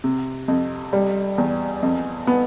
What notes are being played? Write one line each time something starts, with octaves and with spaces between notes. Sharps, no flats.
C3
F2
G3
E2
F2
B3